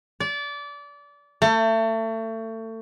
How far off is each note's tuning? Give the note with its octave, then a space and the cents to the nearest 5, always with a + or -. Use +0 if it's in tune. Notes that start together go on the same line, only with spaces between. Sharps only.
D5 -25
A3 +30